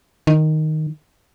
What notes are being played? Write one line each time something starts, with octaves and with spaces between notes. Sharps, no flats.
D#3